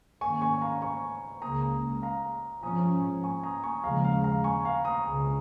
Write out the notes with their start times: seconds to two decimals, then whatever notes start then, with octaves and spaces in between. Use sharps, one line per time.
0.21 G#2 D#3 A#3 C#4 G#5 C#6
0.41 G#5 C#6
0.62 F5 A#5
0.82 G#5 C#6
1.42 C#2 C#3 A#3 A#5 D#6
2.02 F5 A#5
2.63 G#2 F3 C#4 A#5 D#6
3.23 G#5 C#6
3.44 A#5 D#6
3.64 G#5 C#6
3.84 D#2 C#3 F3 G#3 F5 A#5
4.04 F5
4.24 F5 A#5
4.44 G#5 C#6
4.65 F5 A#5
4.84 A#5 D#6
5.04 C#2 C#3 G#3